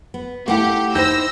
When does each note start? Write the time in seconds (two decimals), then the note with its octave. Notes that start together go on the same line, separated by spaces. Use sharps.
0.14 B3
0.48 A3 E4 G4 F5 F#5
0.95 D#4 E4 C5 E6 G6 A#6